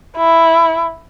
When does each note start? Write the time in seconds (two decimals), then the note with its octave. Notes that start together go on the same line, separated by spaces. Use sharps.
0.17 E4